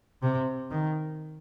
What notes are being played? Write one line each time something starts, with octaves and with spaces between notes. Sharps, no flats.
C3
D#3